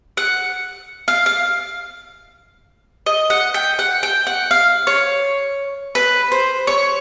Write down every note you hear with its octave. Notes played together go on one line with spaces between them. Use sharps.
F#5
F5
F5
D#5
F#5
G5
F#5
G5
F#5
F5
C#5
B4
C5
C#5